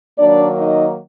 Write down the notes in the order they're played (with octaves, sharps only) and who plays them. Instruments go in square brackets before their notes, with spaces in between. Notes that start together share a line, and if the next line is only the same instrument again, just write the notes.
[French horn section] D#3 F#3 A#3 D4 D5
D#4 D#5